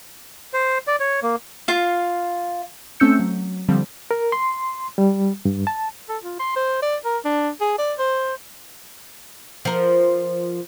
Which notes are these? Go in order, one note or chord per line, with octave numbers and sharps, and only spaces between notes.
C5
D5
C#5
A#3
F4 F5
A3 C4 C#4 E6 G6 C#7
F#3
D3 F3 G3 C4
A#4
C6
G3
G2
A5
A4
F4
C6
C5
D5
A#4
D4
G#4
D5
C5
F3 A#4